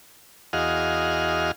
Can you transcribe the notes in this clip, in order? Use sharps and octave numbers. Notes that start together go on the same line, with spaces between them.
E2 F#4 G#4 D#5 F5 F6